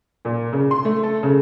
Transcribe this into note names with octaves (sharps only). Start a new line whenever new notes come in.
A#2
C#3
C6
A3
A4
C#3